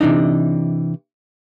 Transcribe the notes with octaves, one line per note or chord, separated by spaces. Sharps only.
C3 D#3 E3 D4 D#4